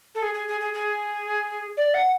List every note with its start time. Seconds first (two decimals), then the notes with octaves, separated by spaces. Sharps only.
0.14 A4
0.22 G#4
0.33 G#4
0.47 G#4
0.60 G#4
0.73 G#4
1.76 D5
1.93 F#5